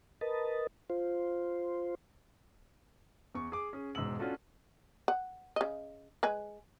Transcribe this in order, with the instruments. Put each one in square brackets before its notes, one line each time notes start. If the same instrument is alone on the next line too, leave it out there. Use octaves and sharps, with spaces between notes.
[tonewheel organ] A#4 B4 D#5 A5
F4 C5
[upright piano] E2 C#6
G#4 D6
C#4 G#4
E1 G#2 G#4 E6 F#7
C#4 D4 F4 F#4 A4
[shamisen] F#5
C#3 D#5
G#3 B4 G#5